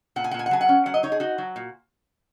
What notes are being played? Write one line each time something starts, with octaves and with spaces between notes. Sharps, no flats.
A#2 F#5
G#5
F#5
A#2
G#5
F#5
F#3 G#5
F#5
C#4
F#3 F#5
D#5
D#4 C#5
G#4
D#4 F#4
F#3
A#2